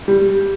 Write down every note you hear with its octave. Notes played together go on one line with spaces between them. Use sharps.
G3